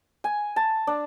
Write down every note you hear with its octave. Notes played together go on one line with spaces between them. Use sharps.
G#5
A5
D4